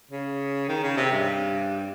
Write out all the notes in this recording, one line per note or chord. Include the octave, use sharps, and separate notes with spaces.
C#3
D#3
C#3
C3
G2